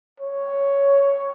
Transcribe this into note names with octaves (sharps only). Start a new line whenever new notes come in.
C#5